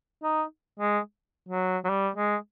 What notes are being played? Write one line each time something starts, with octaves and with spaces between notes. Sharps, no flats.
D#4
G#3
F#3
F#3
G3
G#3